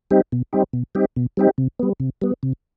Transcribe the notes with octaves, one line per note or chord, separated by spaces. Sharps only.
G3 C4 D#4 G4
B2
G3 C4 D#4 G4
B2
G3 C4 D#4 G4
B2
G3 C4 D#4 G4
C3
G3 B3
C3
G3 B3
C3